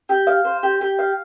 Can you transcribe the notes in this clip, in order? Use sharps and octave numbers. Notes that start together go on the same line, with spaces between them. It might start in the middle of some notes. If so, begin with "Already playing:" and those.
G4
F5
C5
G4
G4
F5